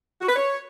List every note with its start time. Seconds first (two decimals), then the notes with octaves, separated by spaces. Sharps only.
0.21 F#4
0.29 B4
0.36 C#5